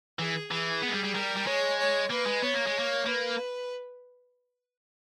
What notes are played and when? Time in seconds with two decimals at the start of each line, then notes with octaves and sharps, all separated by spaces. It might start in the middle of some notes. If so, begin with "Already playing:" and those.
0.18 E3 G#4
0.51 E3 G#4
0.82 B3
0.88 G#3
0.93 G3
1.04 G3
1.14 G3 A#4
1.36 G3
1.46 G#3 C#5
1.78 C#5
2.10 A#3 B4
2.26 G#3
2.42 B3 C#5
2.54 A#3
2.66 G#3
2.79 A#3
3.06 A#3 B4